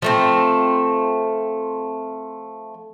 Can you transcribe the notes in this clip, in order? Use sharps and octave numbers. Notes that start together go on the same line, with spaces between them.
F3 A3 C4